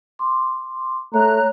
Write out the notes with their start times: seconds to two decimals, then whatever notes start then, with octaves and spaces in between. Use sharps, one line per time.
0.19 C6 D6
1.14 A3 C#5 A#5 F#6